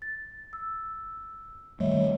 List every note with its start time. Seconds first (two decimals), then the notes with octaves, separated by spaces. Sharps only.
0.02 A6
0.53 E6
1.80 D#3 G3 A3 C#5 D#5 E5